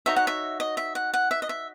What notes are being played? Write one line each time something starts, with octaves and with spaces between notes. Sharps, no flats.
D#4 F#4 C#5 E5
F#5
E5
D#5
E5
F#5
F#5
E5
D#5
E5